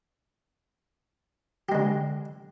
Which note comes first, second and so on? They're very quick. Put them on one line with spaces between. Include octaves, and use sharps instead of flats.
G4 G#3 D3